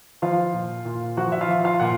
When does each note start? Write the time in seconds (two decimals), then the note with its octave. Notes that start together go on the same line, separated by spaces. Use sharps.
0.22 F3 F4 F5
0.53 A#2
0.85 A#2
1.17 F3 F#4 F#5
1.32 E5
1.41 F4 F5
1.48 F3
1.64 F4 F5
1.80 A#2 F#5